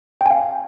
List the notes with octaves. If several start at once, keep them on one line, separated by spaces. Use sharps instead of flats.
F5 G5 G#5